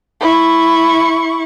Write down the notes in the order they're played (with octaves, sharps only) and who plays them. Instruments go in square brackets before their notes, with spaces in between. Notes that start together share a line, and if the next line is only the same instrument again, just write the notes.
[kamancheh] E4 C#6